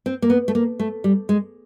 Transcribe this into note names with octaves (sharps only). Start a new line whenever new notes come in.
C4
A#3
B3
A3
A#3
A3
G3
G#3